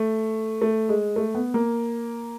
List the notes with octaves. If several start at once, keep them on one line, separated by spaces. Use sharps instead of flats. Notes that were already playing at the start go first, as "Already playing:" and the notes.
Already playing: A3
A3
G#3
A3
B3
A#3